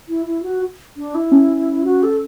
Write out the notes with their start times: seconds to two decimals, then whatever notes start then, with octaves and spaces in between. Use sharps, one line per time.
0.08 E4
0.26 E4
0.43 F#4
0.97 D4
1.15 E4
1.32 C#4
1.84 F#4
2.03 A4